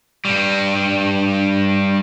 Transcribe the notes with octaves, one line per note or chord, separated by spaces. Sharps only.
G2 G3